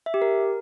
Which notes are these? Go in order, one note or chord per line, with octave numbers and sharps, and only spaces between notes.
E5
G4
A#4